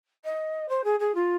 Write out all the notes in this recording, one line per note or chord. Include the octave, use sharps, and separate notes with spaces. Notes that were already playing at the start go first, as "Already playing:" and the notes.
D#5
C5
G#4
G#4
F4